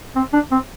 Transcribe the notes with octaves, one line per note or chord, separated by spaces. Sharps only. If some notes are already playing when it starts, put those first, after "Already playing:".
C4
D4
C4